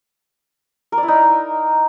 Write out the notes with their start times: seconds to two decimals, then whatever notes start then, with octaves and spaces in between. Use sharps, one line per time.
0.92 A#4
0.98 D5
1.03 E4
1.08 D#4